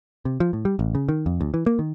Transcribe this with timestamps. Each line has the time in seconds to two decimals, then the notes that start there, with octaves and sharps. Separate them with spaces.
0.25 C3
0.40 F3
0.53 A2
0.65 G3
0.79 A1
0.95 C#3
1.09 D#3
1.26 F2
1.41 D2
1.54 E3
1.66 A#3
1.79 D#3